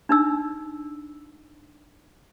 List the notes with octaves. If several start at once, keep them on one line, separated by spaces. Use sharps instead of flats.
D4 D#4 E6